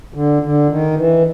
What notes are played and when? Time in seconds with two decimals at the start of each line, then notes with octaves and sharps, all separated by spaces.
0.14 D3
0.42 D3
0.70 D#3
0.98 E3